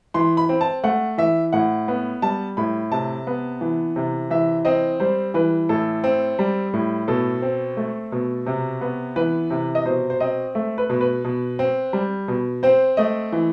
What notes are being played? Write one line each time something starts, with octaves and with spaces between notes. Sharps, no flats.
E3 C6
B5
C4
A5
A3 F#5
E3 E5
A2 F#5
B3
G3 A5
A2 B5
C3 A5
B3
E3
C3
E3 E5
C4 D#5
G3 C5
E3 B4
A2 A4
C4
G3
A2
B2 A4
C4
A3
B2
C3
B3
E3 B4
C3
D#5
B2 C5
C5
C4 D#5
A3 E5
B4
B2
B4
B2
C4
G3
B2
C4 C5
A3 D#5
E3